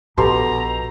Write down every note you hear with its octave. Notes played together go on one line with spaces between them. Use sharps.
A#1 B2 G4 A4 A#5 C6